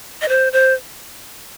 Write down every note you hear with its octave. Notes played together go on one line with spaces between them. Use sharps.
D#5
C5
C5